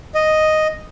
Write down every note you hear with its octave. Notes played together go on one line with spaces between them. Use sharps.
D#5